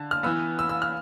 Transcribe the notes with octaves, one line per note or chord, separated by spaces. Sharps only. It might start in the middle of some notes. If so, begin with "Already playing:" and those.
Already playing: D3 A5
F6
E3 B3 E6
E6
E6
F6